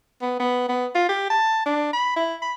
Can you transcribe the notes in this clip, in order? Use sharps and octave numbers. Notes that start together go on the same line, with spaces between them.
B3
B3
B3
F4
G4
A5
D4
B5
E4
B5